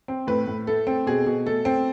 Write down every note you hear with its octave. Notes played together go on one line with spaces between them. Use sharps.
C4
A2 B4
A2
A3 A4
C4
B2 G#4
B2
A3 A4
C4